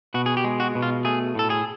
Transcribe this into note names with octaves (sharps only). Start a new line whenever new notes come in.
B2 F#4
G#4
G4
G#3
F#4
B2
F4
A3 G#4
A2 A4
G#4